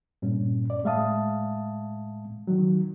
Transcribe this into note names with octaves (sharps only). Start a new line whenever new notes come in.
G2 A#2 C#4
D5
A2 G#3 E5 F5 A5 D#6
D#3 F#3